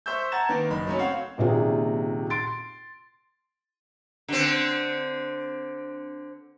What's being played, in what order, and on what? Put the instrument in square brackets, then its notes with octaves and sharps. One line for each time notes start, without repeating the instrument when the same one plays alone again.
[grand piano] C5 E5 C#6 E6 G6
F#5 A5 A#5 G#6 A6 E7
D#3 A#3 B3
F#1 D#4 B5
F#3 A3 C#4
C4 C#5 F5 F#5
[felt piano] D#1 A#1 C3 D#4 F4 G#4
C6 A6 D7
[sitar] D3 C4